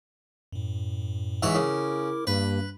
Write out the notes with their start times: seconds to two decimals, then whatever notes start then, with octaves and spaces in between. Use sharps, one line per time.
0.52 F#2 A2
1.43 G#2 E3 C#5
1.55 C#3 E4 A#4 D6
2.27 G2 A#3 B4